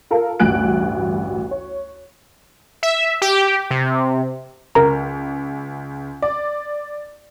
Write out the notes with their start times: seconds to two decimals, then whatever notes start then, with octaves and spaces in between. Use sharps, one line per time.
0.11 F4 A4 A#4 F5
0.40 A1 D2 G2 G#5 F#6 D7
1.51 C#5
2.83 E5
3.22 G4
3.71 C3
4.75 C#2 A#4 A#5
6.22 D5